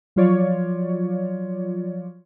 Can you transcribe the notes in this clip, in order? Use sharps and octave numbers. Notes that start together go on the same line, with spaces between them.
F3 F#3 F4 C#5 D5